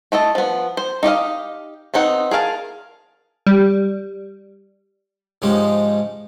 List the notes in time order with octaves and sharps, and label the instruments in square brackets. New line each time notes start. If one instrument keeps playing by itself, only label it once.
[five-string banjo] A3 E4 D#5 A5
F3 B3
C5
D#4 G4 D#5 F5
B3 C4 D#4 F#5
G#4 A#4 F5 A5
[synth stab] G3
[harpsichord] G#2 F3 G#3 C#4 D#4 G4